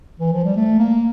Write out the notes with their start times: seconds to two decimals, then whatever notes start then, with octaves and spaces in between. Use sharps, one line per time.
0.20 E3
0.32 F3
0.45 G3
0.56 A3
0.79 A#3